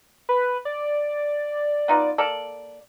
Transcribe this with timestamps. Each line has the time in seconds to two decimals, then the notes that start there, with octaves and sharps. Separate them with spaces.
0.29 B4
0.65 D5
1.88 B3 D#4 F4
2.18 A#3 A4 D5